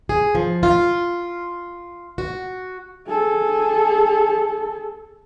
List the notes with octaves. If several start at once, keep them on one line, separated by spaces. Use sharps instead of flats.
G#4
F3
F4
F#4
G#4 A4